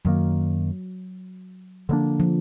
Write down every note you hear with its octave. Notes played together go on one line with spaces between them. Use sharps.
F#2 D#3 F#3 A#3
D3 F3 F#3 A#3 D4
F3